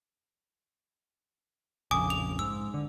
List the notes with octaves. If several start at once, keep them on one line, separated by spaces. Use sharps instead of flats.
A#1 F2 C#3 G#5 D6 D#6
F7
G#2 E6
D3